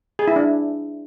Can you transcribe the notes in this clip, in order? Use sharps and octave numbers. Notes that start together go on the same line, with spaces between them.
G#4
E4
D4